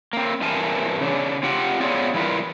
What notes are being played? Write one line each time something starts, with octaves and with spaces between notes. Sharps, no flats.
A#3 C4
G2 E3 C4 A#4 G#5 A5
C#3 D4
C4 F4 G4 F#5 G5
B3 C4 F4 G#4 C#5 D5
E3 G3 E4 F4 A#4 B4